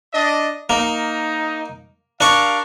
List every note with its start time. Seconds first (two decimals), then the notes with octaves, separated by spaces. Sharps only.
0.13 D4 D#5
0.70 A#3 D#4
2.21 D4 G4 A#4 F5 C#6